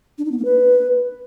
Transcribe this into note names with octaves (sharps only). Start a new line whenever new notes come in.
D4
D#4
B3
A#3
B4